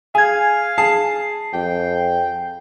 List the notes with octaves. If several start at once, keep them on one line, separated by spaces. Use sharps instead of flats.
G#4 F5 G#5 G#6
G#4 A5 C7
F2 G5